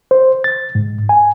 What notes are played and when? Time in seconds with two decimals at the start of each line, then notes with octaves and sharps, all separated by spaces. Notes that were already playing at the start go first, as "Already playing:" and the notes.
0.11 C5
0.44 A6
0.75 G#2
1.09 G#5